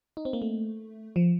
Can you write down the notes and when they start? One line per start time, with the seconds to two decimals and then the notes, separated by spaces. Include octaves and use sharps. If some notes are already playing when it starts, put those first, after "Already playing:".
0.17 D#4
0.25 C4
0.33 A#3
0.42 A3
1.16 F3